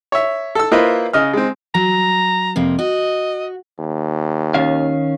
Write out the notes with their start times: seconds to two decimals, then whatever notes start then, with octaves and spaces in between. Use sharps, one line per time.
0.12 C#5 E5
0.55 A4 E6
0.71 A#3 E4 F4 B4 C5 D#5
1.13 C#3 D#5 F6
1.33 G#3 C4
1.74 F#3 A#5
2.56 F2 C3 A#3
2.79 F#4 D#5
3.79 D#2
4.54 D#3 C#4 F5